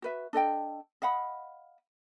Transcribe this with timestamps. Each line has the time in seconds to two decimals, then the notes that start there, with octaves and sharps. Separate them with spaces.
0.02 F#4 B4 E5
0.33 D4 A4 D#5 G5
1.02 D#5 F5 F#5 B5